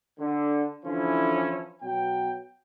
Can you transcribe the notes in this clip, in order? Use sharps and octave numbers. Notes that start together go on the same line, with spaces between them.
D3
D3 E3 F3 C#4 E4
B2 F#3 G5